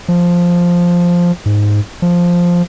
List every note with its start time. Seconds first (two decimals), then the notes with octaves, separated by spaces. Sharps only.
0.08 F3
1.46 G#2
2.02 F3